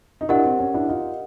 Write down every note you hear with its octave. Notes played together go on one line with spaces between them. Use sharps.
D#4
D4 E4 G4 A#4 D#5 F#5
C4
C#4
D4 E4
D#4 F4